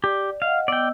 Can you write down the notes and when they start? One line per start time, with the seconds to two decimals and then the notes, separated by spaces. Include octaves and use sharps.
0.04 G4 D5
0.42 D#5 F5 F#5
0.68 B3 D5 D#5 G5 E6